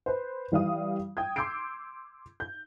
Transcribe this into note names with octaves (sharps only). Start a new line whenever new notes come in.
B4 C5
E3 G3 F5 D#6
G5 D#6 G#6
C6 D6 E6 G6 C7 D7
G6